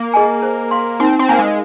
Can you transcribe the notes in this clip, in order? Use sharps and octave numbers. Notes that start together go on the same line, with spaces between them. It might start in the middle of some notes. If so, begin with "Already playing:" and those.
Already playing: A#3
G#4 D#5 G#5
C5
F5 C6
C4 D#4
C4
A#3 A#4 F5 G#5
G#3